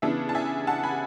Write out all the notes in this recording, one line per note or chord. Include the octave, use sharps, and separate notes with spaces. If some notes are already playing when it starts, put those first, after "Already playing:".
C#3 E3 B3 D4 E5
A5
E5 G#5
F#5 A5
G#5 B5